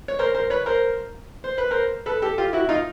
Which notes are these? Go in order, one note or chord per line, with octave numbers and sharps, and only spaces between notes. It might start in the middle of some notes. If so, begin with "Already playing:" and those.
C#5
A#4 C5
A#4 C5
B4 C#5
A#4 C5
C5
B4
A#4 C5
A4 B4
G4 A4
F4 G4
E4 F#4
D#4 F4